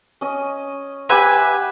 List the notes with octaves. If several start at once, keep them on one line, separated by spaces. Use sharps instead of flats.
C#4 D#5
G4 B4 C5 E5 F#5 G#5